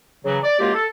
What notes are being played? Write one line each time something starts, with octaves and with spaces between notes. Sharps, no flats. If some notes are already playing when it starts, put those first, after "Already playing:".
C#3 E3 F#3
D5
F#2 G#3 A#3 F4 G4
A4